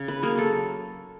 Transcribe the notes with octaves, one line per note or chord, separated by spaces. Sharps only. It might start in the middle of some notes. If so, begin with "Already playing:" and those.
Already playing: C#3
B4
F#3 A#3 G#4
A4